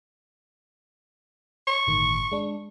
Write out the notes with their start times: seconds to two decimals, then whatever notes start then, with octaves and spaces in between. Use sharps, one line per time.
1.67 C#6
1.87 G1 A2 D#3
2.32 G#3 D4